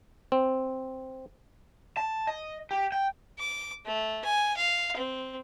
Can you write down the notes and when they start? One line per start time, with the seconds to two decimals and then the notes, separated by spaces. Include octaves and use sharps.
0.32 C4
1.97 A5
2.27 D#5
2.71 G4
2.92 G5
3.39 D6
3.86 A3
4.24 G#5
4.57 F5
4.97 C4